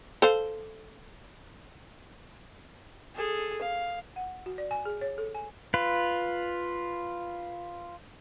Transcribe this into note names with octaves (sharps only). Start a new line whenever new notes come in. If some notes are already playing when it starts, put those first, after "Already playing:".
A4 C5 F5
G#4 A4
F5
F#5
F#4
D5
G#5
G#4
C#5
A4
G#5
F4 B4